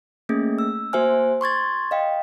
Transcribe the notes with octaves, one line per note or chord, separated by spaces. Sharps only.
A3 A#3 C#4 G#4
E6
A#3 F#4 C5 E5 G#5 F6
C6 C#6 G#6 A6
D#5 F5 G5